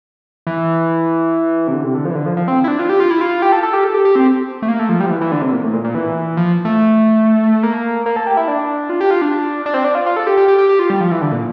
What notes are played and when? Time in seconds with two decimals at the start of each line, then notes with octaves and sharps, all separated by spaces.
0.47 E3
1.68 C3
1.74 D3
1.84 C3
1.95 D3
2.05 F3
2.11 E3
2.15 D3
2.26 F3
2.37 F3
2.48 C4
2.64 E4
2.68 D4
2.79 F4
2.89 G4
3.00 F4
3.11 E4
3.21 F4
3.42 G4
3.52 A4
3.63 A4
3.73 G4
3.84 A4
3.94 G4
4.05 G4
4.16 C4
4.62 A3
4.68 A#3
4.79 A3
4.89 F3
5.00 G3
5.06 F3
5.11 E3
5.21 E3
5.32 D3
5.42 C3
5.53 A#2
5.63 A2
5.73 A#2
5.84 A#2
5.95 E3
6.37 F3
6.65 A3
7.63 A#3
8.06 A#3
8.16 A4
8.27 G4
8.37 E4
8.48 D4
8.90 F4
9.01 G4
9.11 F4
9.22 D4
9.66 D4
9.74 C4
9.85 D4
9.95 F4
10.06 F4
10.17 A4
10.27 G4
10.37 G4
10.48 G4
10.58 G4
10.69 G4
10.79 F4
10.90 G3
11.01 F3
11.11 E3
11.22 D3
11.32 A#2